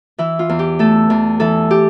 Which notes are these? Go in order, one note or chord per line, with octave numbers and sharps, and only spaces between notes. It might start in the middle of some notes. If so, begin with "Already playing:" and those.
E3 E4
F4
E2
G4
A3 A4
E2
E3 A4
G4